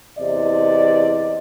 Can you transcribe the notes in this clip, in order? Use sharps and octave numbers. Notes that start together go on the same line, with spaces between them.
E2 C3 D5 D#5